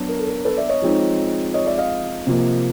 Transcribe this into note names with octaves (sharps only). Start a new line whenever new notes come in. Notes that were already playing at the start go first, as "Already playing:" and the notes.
Already playing: F#3 B3 D4
A#4
A4
A#4
A4 B4
D5 E5
C#5 D#5
F3 G#3 C4 D#4
C#5 D#5
D5 E5
D#5 F5
C3 F3 A#3